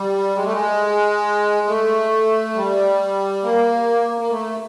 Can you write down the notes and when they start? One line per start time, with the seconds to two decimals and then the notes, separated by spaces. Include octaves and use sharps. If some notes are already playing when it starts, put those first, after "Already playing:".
Already playing: G3
0.36 G#3
0.44 A3
0.52 G#3
1.67 A3
2.55 G3
3.43 A#3
4.21 A#3
4.30 A3